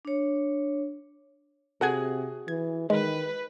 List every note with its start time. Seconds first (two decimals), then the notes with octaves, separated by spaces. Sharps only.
0.05 D4 C#5
1.81 C3 F#4 G#4 A4 F#5 G#6
2.48 E3 G#6
2.90 D#3 G#3 B4